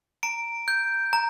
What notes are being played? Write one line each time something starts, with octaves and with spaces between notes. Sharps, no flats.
A#5 D7
G6
A#5